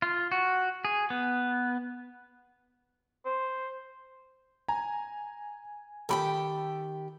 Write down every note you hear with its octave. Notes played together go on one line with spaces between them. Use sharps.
F4
F#4
G#4
B3
C5
G#5 A#5
D#3 G4 A4 G5 B5